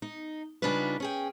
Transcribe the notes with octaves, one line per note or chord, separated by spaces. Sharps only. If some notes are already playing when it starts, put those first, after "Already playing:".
D#4
C#3 G3 D4 D#4 F4 B4
C#4 G#4 G5